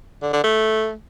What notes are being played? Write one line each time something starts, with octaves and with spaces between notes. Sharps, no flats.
D3
D3
A3